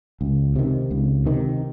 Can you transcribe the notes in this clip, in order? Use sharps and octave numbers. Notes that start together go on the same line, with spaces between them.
C#2
C3 D#3
C#2
C3 D#3